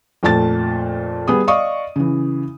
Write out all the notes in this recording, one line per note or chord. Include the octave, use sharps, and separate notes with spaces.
F2 A#2 A3 A5 A6
G3 B3 G#4 D#6
D5 D#5 F5 C#6 D#6
C#3 E3